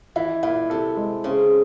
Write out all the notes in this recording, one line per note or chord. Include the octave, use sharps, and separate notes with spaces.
E3 E4
A#2 E4
C3 A4
G#3
C#3 C4